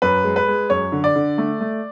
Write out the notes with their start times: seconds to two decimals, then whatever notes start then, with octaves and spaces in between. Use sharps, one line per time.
0.02 F#2 B4
0.24 G#3
0.36 B4
0.48 G#3
0.70 F#2 C#5
0.92 D3
1.04 D5
1.16 D3
1.38 A3
1.61 A3